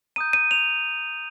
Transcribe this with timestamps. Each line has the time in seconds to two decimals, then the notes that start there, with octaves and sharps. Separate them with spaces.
0.16 A#5 D#6 G6 D#7
0.33 D#7
0.51 F7